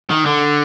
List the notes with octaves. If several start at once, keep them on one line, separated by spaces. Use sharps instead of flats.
D#3
D3